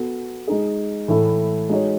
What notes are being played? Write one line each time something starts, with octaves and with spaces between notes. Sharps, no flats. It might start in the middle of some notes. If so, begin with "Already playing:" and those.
Already playing: B3 F#4 A4
G#3 D#4 G#4
A2 E3 A3 E4 A4
G#3 D#4 F#4 C#5